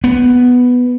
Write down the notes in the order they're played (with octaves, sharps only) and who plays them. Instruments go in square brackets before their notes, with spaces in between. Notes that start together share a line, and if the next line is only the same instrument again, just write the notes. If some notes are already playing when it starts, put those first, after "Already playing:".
[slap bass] B3